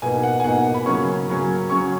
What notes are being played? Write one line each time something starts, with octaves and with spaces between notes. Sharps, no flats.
B2 A#3 D#4 G#5
F#5
G#5
B2 A#3 D#4 F#5
B5
C#3 F#3 A#3 C#4 C#6
C#3 F#3 A#3 C#4
C#3 F#3 C#4 C#6